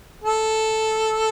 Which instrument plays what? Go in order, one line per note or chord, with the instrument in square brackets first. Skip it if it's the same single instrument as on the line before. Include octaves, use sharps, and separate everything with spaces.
[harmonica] A4